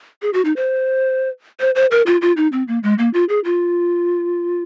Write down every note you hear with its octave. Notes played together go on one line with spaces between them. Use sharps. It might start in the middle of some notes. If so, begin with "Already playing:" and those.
G#4
F#4
D#4
C5
C5
C5
A#4
F4
F4
D#4
C4
A#3
G#3
A#3
F4
G#4
F4